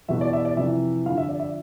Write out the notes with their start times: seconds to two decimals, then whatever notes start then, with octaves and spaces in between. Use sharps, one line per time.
0.08 E2 B2 E5
0.21 D5
0.33 E5
0.45 D5
0.57 F2 C3 E3 E5
1.05 F2 D3 F3 F5
1.17 E5
1.29 D5
1.39 E5